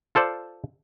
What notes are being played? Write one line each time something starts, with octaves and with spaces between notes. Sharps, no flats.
F4 A4 C5 D5